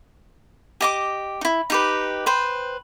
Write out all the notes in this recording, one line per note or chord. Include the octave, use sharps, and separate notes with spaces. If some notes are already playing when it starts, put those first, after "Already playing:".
G4 D#5 D6
D#4 E4
D#4 G4 B4
B4 C5 G5